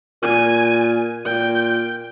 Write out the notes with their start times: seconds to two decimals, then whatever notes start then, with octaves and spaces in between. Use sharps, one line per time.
0.22 A#2 G#5
1.26 A#2 G5